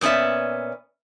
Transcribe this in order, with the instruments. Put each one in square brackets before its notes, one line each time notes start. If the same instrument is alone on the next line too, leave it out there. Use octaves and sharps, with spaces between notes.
[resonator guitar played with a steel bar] A#2 B3 C#4 D5 E5